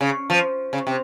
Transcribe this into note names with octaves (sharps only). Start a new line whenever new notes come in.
C#3
F3
C#3
C3